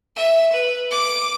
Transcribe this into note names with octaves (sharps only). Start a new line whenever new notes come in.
E5
B4
D6